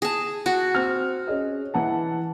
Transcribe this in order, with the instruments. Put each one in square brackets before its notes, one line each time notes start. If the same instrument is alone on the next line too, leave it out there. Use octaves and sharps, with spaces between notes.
[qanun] G#4 A5
F#4
[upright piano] C4 F6
C#4 G#4 D#5
E3 F#5 A5